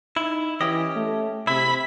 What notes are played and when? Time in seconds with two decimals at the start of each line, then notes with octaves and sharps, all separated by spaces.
0.17 D#4 E4
0.61 E3 C#4 G4 D#5
0.97 A3
1.47 C3 E4 B5